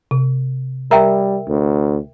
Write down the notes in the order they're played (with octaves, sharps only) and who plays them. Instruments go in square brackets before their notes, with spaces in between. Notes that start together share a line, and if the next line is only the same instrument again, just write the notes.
[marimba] C3
[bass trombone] G3 [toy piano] A#4 E5 G5 [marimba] A#5
[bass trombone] D2